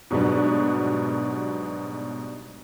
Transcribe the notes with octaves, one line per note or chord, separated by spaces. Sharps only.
G#2 B2 F#3 G3 B3 D4